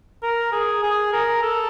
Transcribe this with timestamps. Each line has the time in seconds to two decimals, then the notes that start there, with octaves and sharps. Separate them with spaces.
0.23 A#4
0.52 G#4
0.83 G#4
1.13 A#4
1.43 A4